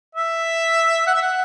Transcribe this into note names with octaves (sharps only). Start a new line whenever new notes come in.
E5
F#5
E5
F#5